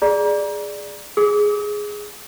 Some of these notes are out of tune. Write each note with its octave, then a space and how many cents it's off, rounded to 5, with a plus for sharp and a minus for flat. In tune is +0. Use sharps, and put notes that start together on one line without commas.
G#4 +0 D5 +0 A#5 +30
G#4 +0 D#6 +35